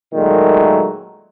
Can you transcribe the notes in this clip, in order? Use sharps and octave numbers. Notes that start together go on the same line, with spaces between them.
A#2 D#3 F#3 G#3 A3